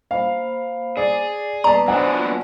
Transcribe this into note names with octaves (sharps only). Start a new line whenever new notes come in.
A#3 C5 F5 B5
G#4 D5
A#3 B3 B4 D5 A5 A#5
F#3 B3 D4 C5 F#5 G#5
A#3 F4